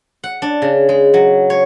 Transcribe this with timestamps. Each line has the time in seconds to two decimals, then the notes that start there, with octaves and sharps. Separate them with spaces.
0.24 F#5
0.42 D4
0.62 C#3
0.89 G#3
1.14 F#3
1.50 C#5